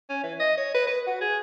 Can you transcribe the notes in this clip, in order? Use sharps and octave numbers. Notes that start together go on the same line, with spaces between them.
C#4
E3
D#5
C#5
B4
B4
F#4
G#4